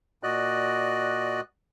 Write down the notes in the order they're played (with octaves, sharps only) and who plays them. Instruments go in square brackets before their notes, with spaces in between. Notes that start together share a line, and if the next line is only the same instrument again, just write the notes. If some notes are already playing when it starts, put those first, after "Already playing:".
[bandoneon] A#2 F#4 D5 D#5 F#6